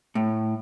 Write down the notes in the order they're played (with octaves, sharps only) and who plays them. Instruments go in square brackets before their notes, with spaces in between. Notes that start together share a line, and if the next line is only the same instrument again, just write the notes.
[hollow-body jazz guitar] A2